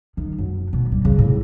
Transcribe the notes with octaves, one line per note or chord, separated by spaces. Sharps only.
D#3
F#2
B2
G3
C#3
A2